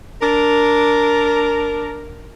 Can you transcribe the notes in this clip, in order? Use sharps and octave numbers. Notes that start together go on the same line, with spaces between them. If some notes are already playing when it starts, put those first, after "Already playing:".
D4 A#4